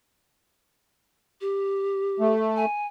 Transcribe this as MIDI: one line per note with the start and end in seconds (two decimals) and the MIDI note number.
1.41 2.33 67
2.20 2.66 57
2.56 2.87 80